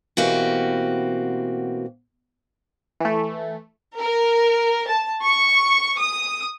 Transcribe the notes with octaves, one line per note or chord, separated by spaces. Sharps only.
B2 E3 A#3 C4 F#4 G4
E3 A3
A#4
A5
C#6
D#6